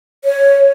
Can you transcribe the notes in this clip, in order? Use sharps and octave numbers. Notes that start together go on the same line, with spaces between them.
C#5